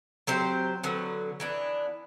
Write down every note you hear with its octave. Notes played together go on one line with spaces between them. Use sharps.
F#3 C4 G4 C5
D3 F#3 B3
E3 B3 D4